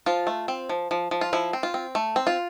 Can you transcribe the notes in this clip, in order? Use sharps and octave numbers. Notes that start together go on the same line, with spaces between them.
F3 F4
A3
C4
F3
F3
F3
F4
F3 E4
C4
F4
C4
A3
C4
F4